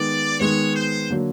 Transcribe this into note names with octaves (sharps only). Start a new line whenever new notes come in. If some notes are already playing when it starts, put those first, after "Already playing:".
Already playing: D#3 G#3 B3 D5
D#3 G#3 B3 C#5
C5
D3 F#3 A#3